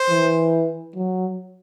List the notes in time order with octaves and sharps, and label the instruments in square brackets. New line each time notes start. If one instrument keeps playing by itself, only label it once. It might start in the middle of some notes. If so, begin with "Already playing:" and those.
Already playing: [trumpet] C5
[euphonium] E3
F#3